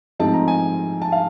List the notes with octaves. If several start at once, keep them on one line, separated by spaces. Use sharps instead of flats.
G#2 F3 A3 C4 D#4 A5
A#5
G#5
A5
F5